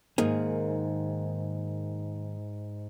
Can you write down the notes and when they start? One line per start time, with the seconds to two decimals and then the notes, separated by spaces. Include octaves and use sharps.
0.18 G#2 D#3 A#3 G#4